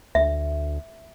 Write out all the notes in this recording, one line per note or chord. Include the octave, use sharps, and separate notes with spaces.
D2 E5